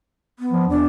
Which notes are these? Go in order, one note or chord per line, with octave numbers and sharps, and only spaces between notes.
B3
F3
E2 D4